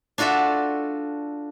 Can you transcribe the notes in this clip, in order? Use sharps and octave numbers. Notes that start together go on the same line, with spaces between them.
D4 F4 F#4 A4 E5